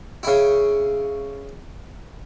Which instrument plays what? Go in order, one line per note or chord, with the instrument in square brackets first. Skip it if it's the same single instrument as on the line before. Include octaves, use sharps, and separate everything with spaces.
[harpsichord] C#3 E4